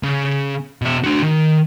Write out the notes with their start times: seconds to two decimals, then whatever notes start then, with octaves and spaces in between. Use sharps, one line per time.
0.03 C#3
0.81 B2 E5
1.03 D4 F#4
1.23 D#3